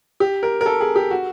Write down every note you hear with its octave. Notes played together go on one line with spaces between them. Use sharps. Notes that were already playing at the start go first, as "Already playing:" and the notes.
G4
A#4
A#4
A4
G#4
G4
F#4